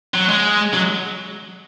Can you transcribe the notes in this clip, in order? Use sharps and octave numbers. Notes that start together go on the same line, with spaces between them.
F#3
G#3
F#3